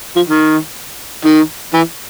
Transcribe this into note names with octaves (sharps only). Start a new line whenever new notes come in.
F3
D#3
D#3
E3